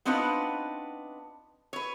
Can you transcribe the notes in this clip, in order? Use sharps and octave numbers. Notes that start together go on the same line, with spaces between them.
B3 C4 D4 D#4 F4 B4
B4 C#5